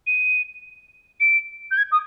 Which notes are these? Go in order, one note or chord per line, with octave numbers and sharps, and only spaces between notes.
D#7
D7
G6
G#6
D#6